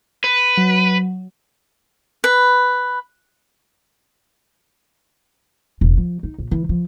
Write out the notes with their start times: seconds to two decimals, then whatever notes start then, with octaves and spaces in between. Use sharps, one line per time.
0.24 B4
0.57 F#3
2.24 B4
5.81 E1
5.97 F3
6.23 D#4
6.39 A#1
6.51 E3
6.69 F3